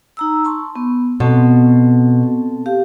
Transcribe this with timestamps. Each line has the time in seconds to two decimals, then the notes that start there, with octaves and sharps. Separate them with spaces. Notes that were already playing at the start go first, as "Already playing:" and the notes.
0.17 D#4 A#5 E6
0.44 A5 C6 C#6
0.76 B3
1.20 B2 C4 A4 A5
2.66 G4 F5